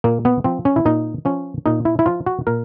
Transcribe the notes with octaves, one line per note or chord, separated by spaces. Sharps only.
A#2 A#3
B3
F3 C4
C#4
E4
A#2 D#4
F3 C#4
A#2 D#4
E4
E4
F3 F4
F#4
A#2 A#4